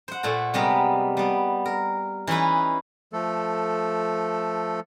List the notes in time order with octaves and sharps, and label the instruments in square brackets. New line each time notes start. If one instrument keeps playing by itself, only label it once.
[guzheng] C5 F#5
A#2 A3 A4 F#5
C3 G3 G#3 B3 A#4
G3 B3
A#4
E3 C#4 D#4 E4 B4
[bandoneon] F3 A3 A4